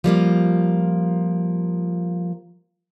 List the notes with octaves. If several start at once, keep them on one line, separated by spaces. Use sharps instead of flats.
F3 G3 A#3 F4